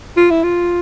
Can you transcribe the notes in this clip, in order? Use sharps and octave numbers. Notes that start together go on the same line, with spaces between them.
F4
E4
F4